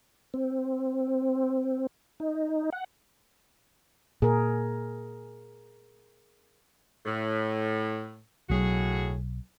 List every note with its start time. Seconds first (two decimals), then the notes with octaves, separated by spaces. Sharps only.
0.34 C4
2.20 D#4
2.73 F#5
4.22 A#2 G#4 A#4
7.06 A2
8.50 B1 A2 F#3 F#4 G#4